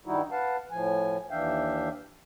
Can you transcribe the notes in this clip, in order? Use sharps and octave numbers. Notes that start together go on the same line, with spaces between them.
G2 D#3 G3 D#4 E4 F#4
B4 F5 F#5 A5
A2 F3 G#5
D#2 E3 D4 E5 F5 G5